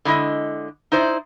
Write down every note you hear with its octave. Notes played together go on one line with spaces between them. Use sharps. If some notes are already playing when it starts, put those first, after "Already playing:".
D3 G#3 E4 D#5
D#4 E4 C5 D5